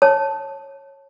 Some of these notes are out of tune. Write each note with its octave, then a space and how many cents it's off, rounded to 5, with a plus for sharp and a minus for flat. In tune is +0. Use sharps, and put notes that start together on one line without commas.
C#5 -15 A5 +0